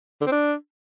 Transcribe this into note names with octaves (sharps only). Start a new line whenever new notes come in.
D3
C4
D4